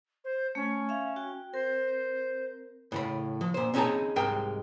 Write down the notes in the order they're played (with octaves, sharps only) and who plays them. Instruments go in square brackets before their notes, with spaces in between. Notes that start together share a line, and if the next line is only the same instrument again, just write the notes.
[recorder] C5
[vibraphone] A3 [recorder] C#4
[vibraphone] E5 F5
F#4 G5
[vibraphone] C4 A#4 [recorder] C5
[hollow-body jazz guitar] A2 C#3 B5
F3
A#2 C5
C4 C#4 D#4 G#4 A5 A#5
C2 G#2 G#3 A#4 G5